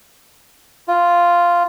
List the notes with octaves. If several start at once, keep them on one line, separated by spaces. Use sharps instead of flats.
F4